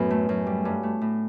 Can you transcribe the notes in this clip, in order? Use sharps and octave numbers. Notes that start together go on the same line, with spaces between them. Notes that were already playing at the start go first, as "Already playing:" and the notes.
Already playing: F#2 A2 B3
A3
F#2
G3
G2
A3
A2